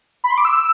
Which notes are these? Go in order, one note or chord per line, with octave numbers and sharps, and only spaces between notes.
B5
C6
D6
E6